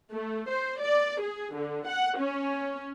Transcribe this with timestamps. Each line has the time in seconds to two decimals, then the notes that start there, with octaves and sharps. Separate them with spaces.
0.12 A3
0.50 C5
0.81 D5
1.22 G#4
1.55 D3
1.87 F#5
2.18 C#4